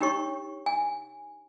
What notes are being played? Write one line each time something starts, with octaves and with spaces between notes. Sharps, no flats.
D4 D#4 G4 C#5 C#6
G#5